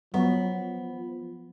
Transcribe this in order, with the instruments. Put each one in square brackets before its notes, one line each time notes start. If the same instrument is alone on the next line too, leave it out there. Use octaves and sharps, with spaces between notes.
[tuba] F3 [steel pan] F#3 [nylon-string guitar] B3